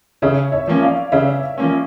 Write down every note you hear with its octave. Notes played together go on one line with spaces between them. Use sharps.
C#3 C#5 E5
C#5 E5
F3 A#3 C#4
D5 F5
C#3 C#5 E5
F3 A#3 C#4